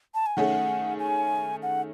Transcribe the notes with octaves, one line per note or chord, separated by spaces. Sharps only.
A5
G#5
D#3 A3 C#4 G#4 F#5
G#5
F#5